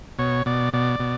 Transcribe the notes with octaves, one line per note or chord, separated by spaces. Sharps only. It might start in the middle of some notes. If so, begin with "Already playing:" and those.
B2 C#5
B2 D5
B2 D5
B2